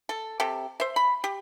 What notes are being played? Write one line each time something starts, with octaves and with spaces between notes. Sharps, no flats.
A4
C3 G4 A4
C5 E5
B5
G4